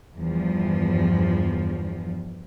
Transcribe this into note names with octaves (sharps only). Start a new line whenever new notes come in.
E2 G2 F3